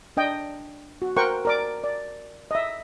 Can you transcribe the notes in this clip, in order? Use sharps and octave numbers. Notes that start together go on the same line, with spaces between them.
D4 D#5 G5
F#4
A#4 C5 F#5 G5 C#6
A#4 D5 D6
D5
D#5 E5